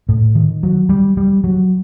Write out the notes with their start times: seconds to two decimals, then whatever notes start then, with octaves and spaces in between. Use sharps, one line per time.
0.09 A2
0.35 D#3
0.63 F#3
0.89 G3
1.17 G3
1.44 F#3